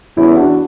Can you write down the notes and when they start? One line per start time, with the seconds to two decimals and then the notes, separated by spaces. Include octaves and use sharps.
0.17 E2 C#4 E4
0.36 D4 F#4